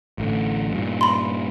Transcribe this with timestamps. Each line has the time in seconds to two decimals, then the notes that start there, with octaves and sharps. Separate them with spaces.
0.18 A1 A2 D3
0.71 G2 A#2
1.01 B5 C6